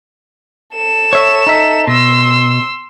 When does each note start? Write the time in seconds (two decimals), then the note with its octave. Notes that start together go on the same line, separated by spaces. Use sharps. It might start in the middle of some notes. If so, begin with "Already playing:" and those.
0.75 A4 E7
1.13 C#5 E5
1.47 D#4 E5
1.87 B2 C6 E6